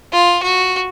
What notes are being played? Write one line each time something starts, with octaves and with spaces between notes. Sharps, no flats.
F4
F#4